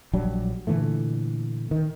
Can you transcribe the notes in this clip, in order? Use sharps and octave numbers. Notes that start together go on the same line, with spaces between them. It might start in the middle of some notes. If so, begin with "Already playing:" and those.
A#1 F#3 G3 D4
A#2 D3 E3 A3
D#3